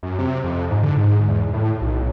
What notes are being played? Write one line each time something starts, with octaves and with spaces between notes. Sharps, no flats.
F#2
C3
F2
G#2
D3
G#2
E2
A2
B1